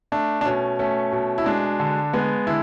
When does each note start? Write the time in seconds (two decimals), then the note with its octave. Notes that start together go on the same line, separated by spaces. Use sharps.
0.12 A3 D4
0.41 D4
0.46 B2 C#4
0.79 A3 C#4
1.12 B2
1.38 E4
1.46 G#3 D4
1.80 D3
2.13 G#3 B3
2.47 D3 E4